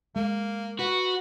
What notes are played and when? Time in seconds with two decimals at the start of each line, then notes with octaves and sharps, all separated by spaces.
0.16 G#3 A#3
0.79 F#4 B4